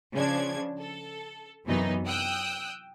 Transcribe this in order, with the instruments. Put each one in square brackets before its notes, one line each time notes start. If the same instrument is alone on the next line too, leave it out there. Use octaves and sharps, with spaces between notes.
[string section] C#3 F3 D4 G#6
A4
F#2 C3 E3 F#3 B3 D#4
G5 D#6 E6 F#6